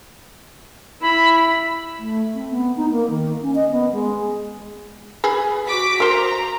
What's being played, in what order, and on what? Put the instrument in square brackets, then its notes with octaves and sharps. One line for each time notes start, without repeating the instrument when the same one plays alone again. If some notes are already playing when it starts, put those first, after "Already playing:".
[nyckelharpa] E4 [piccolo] B5
[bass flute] A3
C4
B3
D#4
A#3
D#3
C#4
D#5
B3
G#3
[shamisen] G#4 B4
[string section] F#4 D6 B6
[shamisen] A#4 C5 [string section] A#5